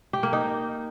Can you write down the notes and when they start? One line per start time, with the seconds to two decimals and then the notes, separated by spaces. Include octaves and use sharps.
0.13 G4
0.23 A#3
0.33 D#4